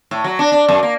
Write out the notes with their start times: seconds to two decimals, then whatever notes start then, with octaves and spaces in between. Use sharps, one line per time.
0.11 A2
0.24 F#3
0.39 D4
0.52 D4
0.69 F#2
0.83 A#3